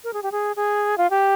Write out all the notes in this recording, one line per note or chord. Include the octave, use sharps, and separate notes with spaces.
A#4
G#4
G4
G#4
G#4
F4
G4